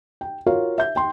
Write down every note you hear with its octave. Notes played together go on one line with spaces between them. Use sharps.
G5
F4 F#4 A#4 C#5 F5
E5 G6
G5 C6